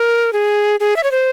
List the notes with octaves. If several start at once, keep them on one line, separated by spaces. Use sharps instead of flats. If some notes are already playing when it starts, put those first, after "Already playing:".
Already playing: A#4
G#4
G#4
E5
C#5
C5